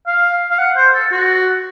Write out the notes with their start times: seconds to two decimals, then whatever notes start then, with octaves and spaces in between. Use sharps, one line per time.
0.07 F5
0.51 F5
0.58 F#5
0.76 C5
0.94 A4
1.11 F#4